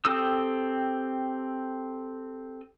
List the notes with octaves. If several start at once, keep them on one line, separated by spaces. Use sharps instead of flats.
C4 G4 A4 D#6 E6